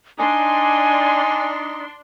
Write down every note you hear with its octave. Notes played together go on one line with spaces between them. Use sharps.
D4 D#4 G#5 C6